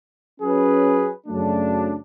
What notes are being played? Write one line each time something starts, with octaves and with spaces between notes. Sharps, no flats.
F#3 C#4 G#4 B4
F#2 C#3 F#3 A3 D4